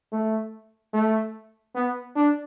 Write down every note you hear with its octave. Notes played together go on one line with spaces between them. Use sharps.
A3
A3
B3
D4